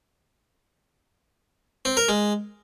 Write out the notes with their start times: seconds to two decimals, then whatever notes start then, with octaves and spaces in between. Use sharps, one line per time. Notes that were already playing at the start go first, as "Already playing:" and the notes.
1.85 C4
1.97 A#4
2.09 G#3